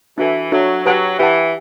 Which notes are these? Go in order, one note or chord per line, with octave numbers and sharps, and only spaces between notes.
E3 D4 F#4 A4 E5
F#3 D4 F#4 A4 E5
F#3 G4 B4 F#5 A5
E3 G4 B4 F#5 A5